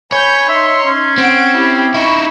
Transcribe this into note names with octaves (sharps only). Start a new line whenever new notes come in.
C#5 G#5 B5 G6
D#4 E5 C6
C#4
C4 F#5 D7
E4 G4 B5
D#4 E4 B5 C#6